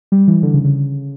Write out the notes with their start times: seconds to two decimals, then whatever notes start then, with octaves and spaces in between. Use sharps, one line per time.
0.12 G3
0.28 E3
0.43 D3
0.54 C#3
0.65 C#3